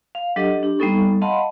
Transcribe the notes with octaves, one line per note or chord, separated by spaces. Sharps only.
F5
F#3 D4 G4 A4 D#5
D4 G4
G3 A#3 B3 D#4 A4 C#6
D#5 F5 F#5 A5 B5 C6